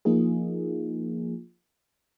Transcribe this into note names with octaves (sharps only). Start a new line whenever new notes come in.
F3 A#3 D#4 F4 G#4